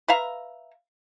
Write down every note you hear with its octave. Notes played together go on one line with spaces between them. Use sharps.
B4 E5 F5 A#5